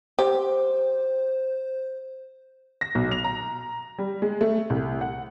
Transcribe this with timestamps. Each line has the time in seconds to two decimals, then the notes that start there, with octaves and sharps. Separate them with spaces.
0.19 G4 C5
2.81 A#6
2.95 B1
3.11 F7
3.24 A#5
3.98 G3
4.22 G#3
4.41 A3
4.70 C2
5.01 F#5